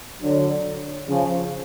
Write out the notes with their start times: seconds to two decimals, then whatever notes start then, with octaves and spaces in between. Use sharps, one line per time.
0.21 D3 F#3
1.08 C#3 F3